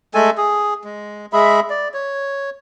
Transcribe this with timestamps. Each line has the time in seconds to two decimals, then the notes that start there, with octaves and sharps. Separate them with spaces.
0.14 G#3 A3 A4 G#5
0.37 G#4
0.84 G#3
1.33 G#3 G#4 E5 B5
1.70 D5
1.94 C#5